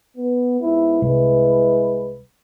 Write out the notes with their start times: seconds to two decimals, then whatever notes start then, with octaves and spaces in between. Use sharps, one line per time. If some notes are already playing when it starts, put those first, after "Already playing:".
0.17 B3
0.61 G#2 B3 E4
1.02 C2 G#3 E4 B4